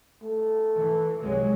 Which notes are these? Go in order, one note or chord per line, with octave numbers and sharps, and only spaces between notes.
A3
E3
C2 F#3 G#3